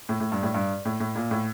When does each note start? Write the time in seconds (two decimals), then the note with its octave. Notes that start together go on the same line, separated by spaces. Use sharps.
0.09 A2
0.20 A2
0.32 G2
0.43 A2
0.54 G2
0.85 A2
1.00 A2
1.15 A#2
1.31 A2